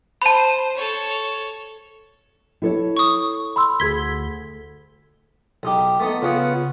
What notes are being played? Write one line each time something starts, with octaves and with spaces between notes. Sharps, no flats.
C5 A5 B5
A4 C#5
E4 A4 C#5
C#6 D#6
B5 C6 E6
D2 G#4 G#6 B6 G7
B1 D#4 G4
A3 B3 D#4
C#3 B3 C#4 F4 G#4 F#5